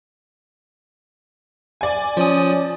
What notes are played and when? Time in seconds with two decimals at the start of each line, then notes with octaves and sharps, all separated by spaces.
1.81 D5 G#5
2.17 F3 C#4 D#6